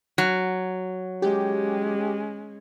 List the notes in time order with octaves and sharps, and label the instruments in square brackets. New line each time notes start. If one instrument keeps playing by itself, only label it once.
[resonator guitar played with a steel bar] F#3
[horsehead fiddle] G#3 C#4 [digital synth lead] G4